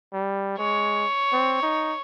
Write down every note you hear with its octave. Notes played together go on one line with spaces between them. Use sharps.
G3
G#3 C#5
C4
D#4